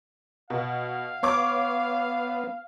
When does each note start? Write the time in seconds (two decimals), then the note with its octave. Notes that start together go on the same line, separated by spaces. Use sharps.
0.50 B2 F5
1.23 B3 C#5 C#6 D6